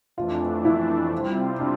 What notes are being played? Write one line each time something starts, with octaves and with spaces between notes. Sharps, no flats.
F2 E3 A3 D4 F4
E4
C3 G3 C4 F4
D4